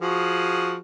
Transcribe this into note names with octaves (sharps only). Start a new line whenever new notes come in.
F3 F#4 G#4